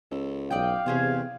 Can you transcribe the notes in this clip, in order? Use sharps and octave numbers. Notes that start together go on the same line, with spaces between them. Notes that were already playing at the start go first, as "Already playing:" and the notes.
C#2 A4
B1 D5 D#5 F5 G5
E2 C3 C#4 G#4 C5